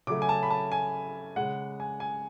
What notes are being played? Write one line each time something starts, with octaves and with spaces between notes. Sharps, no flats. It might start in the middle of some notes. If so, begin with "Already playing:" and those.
C#3 F#3 A3 D6
G#5
A5
B5
A5
G#5
C#3 G#3 F#5
G#5
G#5